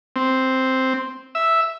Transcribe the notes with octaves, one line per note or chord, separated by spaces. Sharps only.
C4
E5